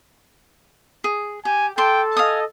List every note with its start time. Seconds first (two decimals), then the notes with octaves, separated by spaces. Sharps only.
1.04 G#4
1.45 G4 G#5
1.78 A4 G5 A5 C6 D6
2.17 D#5 F5 G#5 D#6